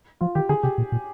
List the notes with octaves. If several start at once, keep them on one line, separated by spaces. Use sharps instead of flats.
F3 F4
D#3 G4
D3 G#4
C3 G4
A#2
A#2